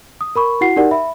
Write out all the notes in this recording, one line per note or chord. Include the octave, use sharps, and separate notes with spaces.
D#6
A#4 B5 C#6
E4 F#4 F#5 C7
D#4 G4 A#4 D5 F#5
E5 B5